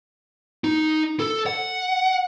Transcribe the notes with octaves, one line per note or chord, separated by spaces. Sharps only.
D#4
A4
F#5